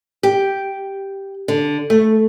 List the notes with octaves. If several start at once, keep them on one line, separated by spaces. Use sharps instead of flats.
G4
D3
A3